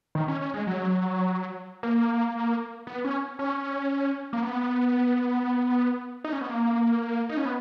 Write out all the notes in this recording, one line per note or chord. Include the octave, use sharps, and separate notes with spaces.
D#3
C#4
C#4
G#3
F#3
A#3
B3
C#4
C#4
A#3
B3
D#4
C#4
B3
A#3
D#4
C#4
B3